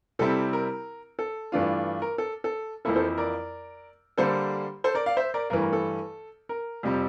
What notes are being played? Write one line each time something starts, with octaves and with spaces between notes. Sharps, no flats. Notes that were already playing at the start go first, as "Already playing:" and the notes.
C3 G3 C4 E4 A4
A#4
A4
G2 E3 A3 D4 F4
A#4
A4
A4
F2 E3 A#3 E4 A4
A4 C5
A#4 D5
D3 G3 A#3 A4 C5
A4 C5
A#4 D5
D5 F5
C5 E5
A#4 D5
G2 E3 A3 A#4
A#4
A4
A#4
F2 C3 G3 C4